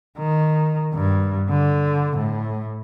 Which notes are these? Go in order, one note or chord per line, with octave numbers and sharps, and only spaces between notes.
D#3
G2
D3
A2